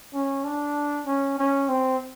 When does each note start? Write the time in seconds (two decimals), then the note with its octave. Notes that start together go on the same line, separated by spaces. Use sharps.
0.14 C#4
0.44 D4
1.06 C#4
1.38 C#4
1.68 C4